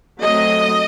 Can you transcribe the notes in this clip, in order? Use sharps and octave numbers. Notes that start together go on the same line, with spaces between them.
F#3 A3 C4 D#5